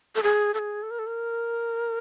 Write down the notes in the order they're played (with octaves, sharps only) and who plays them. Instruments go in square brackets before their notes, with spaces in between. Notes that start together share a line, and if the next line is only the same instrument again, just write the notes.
[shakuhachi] A4
G#4
A4
G#4
A4
A#4
A4
A#4